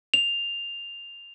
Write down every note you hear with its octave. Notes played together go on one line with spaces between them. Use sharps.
F7